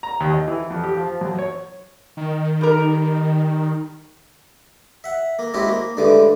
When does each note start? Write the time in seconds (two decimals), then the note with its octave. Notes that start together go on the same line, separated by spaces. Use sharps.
0.03 A#5
0.20 D#2
0.33 D#5
0.48 E3
0.70 F2
0.84 G4
0.97 F3
1.21 F#2
1.38 C#5
2.17 D#3
2.61 G3 A#4
5.04 E5 F#5
5.39 A#3
5.54 G#3 C4 C#4 E4 F#4 G4
5.68 A#3
5.97 D2 G2 D3 E3 G#3 D6